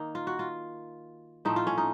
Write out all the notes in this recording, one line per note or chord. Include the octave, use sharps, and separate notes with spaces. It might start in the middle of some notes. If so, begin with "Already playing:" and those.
Already playing: D#3 A#3 D#4
F4
F#4
F4
A2 F3 A3 C4 D#4
F4
C#4
D#4